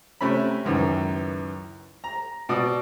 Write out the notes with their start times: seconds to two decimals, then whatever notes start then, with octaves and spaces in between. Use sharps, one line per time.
0.21 C3 A3 C#4 B5
0.65 C#2 F#2 D#3 E3
2.04 A#5
2.49 B2 D5 D#6